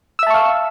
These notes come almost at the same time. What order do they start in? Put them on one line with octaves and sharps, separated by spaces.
E6 E5 A5 C#6 F5